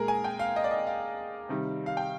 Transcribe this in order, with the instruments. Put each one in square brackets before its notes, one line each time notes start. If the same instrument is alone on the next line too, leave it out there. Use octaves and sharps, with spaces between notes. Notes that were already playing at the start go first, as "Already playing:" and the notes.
Already playing: [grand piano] A#2 G#3 G#4 A#4
G#5
G5
F5
D#5
D5
D#5
F5
C3 D#3 G3
F5
G5